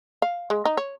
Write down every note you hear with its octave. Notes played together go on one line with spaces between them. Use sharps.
F5
G#3
D#4
C#5